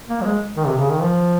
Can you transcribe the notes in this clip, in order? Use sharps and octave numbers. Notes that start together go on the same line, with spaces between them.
A#3
F#3
G#3
D#3
C3
C#3
D#3
F3